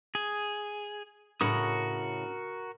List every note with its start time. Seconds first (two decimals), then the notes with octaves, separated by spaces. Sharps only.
0.15 G#4
1.41 A2 C#3 F#4 A#4 D#6